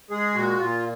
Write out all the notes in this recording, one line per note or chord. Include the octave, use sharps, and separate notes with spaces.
G#3 G#4
A#2 F#4
A#2 F4